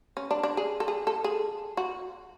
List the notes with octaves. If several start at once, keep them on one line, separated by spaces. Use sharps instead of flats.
C#4
D4
D4
G#4
A4
G#4
A4
G#4
F#4